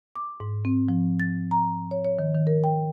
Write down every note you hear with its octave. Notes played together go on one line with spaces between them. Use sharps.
D6
G#2
C4
F3
A6
A#5
C#5
C#5
D#3
D#3
A#4
G5